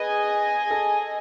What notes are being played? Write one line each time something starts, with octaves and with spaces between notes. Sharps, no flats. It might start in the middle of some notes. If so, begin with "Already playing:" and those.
Already playing: G#4 B4 D#5 G#5
A4